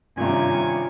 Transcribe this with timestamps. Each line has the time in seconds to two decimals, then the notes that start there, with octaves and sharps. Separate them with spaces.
0.18 G#1 G2 C3 C#4 F4 G#5 A#5